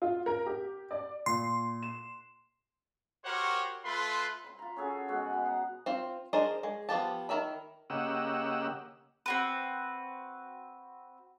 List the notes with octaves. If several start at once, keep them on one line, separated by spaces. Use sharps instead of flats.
F4
A#4
G4
D5
A#2 C6 C7
E7
F#4 G4 A#4 C5 C#5 F#5
A3 F4 B4 B5 C6
B5 C6
F4 A#5
C#4 F#4 G#4 A4
B2 G#3 F#4 F#5
B2 B3
F#5 A#5
C4 F4
D4 G#4 A#4 C5 D#5
G#3
F3 B3 G4 A5
D#3 G#4 A#4 E5 B5
C#3 A#3 G4 D#5 F#5 E6
C4 F#4 B4